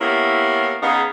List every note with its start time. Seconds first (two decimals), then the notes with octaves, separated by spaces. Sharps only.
0.01 A#3 B3 C#4 E4 G4
0.83 C#3 B3 D#4 G#4 F5